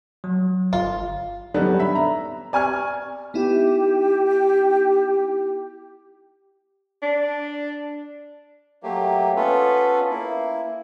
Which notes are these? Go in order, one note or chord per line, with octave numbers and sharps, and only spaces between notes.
F#3
G1 F4
D3 D#3 F#3 G3 B3 D4
E5 B5
A#5
D5 G#5 C#6 F6 G#6
B3 D#4 E4 G4
D4
F#3 A3 A#3 G4
B3 C#4 F4 A4 B4
A#3 E4